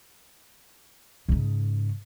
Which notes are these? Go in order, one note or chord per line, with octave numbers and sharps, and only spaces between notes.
G#2 C#3